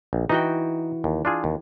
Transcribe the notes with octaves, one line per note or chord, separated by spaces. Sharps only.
A#1
E3 D#4 F#4 G5
D#2
D4 F4 G#4
D#2